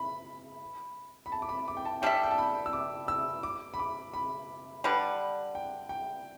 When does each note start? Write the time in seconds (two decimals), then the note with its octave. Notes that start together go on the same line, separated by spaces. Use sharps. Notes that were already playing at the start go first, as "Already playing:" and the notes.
Already playing: B5
1.26 B5
1.32 A5
1.42 D6
1.49 B5
1.68 D6
1.77 G5
1.85 A5
2.02 G3 D4 A4 E5 G5
2.23 G5
2.31 A5
2.38 B5
2.66 E6
2.73 D6
3.08 E6
3.43 D6
3.74 B5
3.79 D6
4.14 B5
4.84 D3 G3 D4 B4
5.55 G5
5.89 G5